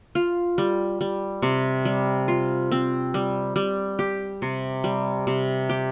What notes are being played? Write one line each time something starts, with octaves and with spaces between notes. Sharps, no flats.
F4
G3
G3
C3
G3
F4
C4
G3
G3
G4
C3
G3
C3
G4